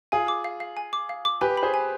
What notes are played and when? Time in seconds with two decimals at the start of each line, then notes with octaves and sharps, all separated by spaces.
0.12 F4 G#4 G#5
0.28 D6
0.44 F5
0.60 F5
0.77 G#5
0.93 D6
1.09 F5
1.25 D6
1.41 G4 B4 G#5
1.57 B5
1.63 G#4 C5
1.74 G#5